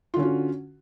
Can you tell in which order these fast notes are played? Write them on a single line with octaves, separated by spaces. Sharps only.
F4 D3 C#4 F#4